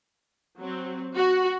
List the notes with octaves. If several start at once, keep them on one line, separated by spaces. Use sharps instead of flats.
F#3 C4
F#4